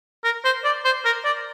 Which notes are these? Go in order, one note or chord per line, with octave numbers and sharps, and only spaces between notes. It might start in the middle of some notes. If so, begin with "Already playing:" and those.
A#4
C5
D5
C5
A#4
D5